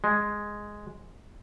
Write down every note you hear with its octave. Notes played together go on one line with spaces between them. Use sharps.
G#3